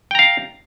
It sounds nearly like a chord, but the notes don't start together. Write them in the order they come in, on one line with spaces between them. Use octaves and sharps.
G5 A#5 F5